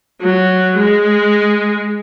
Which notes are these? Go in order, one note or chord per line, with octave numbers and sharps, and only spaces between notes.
F#3
G#3